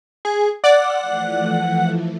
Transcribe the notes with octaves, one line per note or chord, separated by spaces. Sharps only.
G#4
D5 F5 F#5 C6 E6
E3 F3 A3